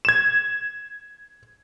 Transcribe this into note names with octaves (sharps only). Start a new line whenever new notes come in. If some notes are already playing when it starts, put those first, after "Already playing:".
G#6 E7